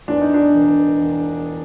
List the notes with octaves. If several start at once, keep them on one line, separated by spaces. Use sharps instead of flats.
E2 D4
D#4
D4
E1
E1